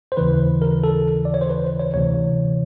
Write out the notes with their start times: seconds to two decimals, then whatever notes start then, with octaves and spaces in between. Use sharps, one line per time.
0.12 C5
0.17 D#2 C#3 E3 B4
0.62 A#4
0.84 A4
1.25 D5
1.34 C#5
1.41 C5
1.50 B4
1.64 C5
1.80 C#5
1.94 D2 C3 E3 C#5